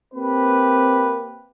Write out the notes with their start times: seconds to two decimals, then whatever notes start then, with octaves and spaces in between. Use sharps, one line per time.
0.14 A#3 C4 G4 B4